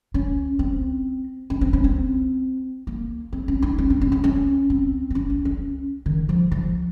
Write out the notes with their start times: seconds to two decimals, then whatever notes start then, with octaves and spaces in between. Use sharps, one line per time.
0.14 C#4
0.59 C4
1.50 C#4
1.61 C4
1.73 C#4
1.84 C4
2.87 A#3
3.33 C4
3.48 C#4
3.62 D#4
3.78 C#4
3.90 C4
4.01 C#4
4.12 C#4
4.24 C#4
4.70 C4
5.10 C4
5.15 C#4
5.30 C#4
5.45 C#4
6.06 D#3
6.29 F3
6.52 F3